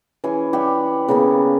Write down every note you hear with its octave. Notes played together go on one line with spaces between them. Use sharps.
E3 C#4 G#4
G4 D5 E5 F#5
C#3 A#3 B3